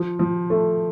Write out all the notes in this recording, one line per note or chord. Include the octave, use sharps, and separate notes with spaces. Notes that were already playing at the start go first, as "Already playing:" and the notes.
Already playing: F3
F3
A3